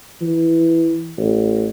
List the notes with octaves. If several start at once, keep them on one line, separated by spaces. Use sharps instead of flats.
E3
A1